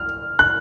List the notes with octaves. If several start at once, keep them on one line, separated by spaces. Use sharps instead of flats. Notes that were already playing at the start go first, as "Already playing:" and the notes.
Already playing: F6
F#6